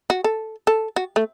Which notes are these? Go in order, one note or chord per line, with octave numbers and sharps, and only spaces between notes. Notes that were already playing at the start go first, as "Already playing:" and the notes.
F#4
A4
A4
F#4
A3